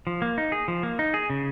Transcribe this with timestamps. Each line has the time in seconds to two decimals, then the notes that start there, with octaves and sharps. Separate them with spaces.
0.07 F3
0.22 A#3
0.38 D#4
0.52 G#4
0.68 F3
0.83 A#3
0.99 D#4
1.14 G#4
1.30 C#3